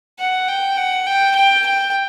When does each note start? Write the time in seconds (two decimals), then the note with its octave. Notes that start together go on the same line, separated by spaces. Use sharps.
0.19 F#5
0.48 G5
0.77 F#5
1.06 G5
1.36 G5
1.66 G5